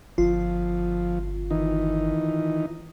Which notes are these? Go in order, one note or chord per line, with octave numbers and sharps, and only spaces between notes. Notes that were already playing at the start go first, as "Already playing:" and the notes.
G1 F3 F4
D#3 E3 D#4